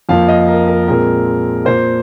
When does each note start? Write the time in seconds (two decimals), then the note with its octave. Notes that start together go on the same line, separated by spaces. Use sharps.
0.09 F2 F3 A#3 F5
0.28 D#5
0.48 A#4
0.68 A#4
0.88 A#2 G#3 C4 A#4
1.65 A#2 A#3 C5